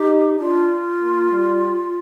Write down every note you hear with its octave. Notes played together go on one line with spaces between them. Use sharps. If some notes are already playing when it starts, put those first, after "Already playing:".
Already playing: D#4 G4
D4 F4
A#3
G3